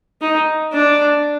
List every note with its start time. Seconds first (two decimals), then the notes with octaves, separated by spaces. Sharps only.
0.21 D#4
0.73 D4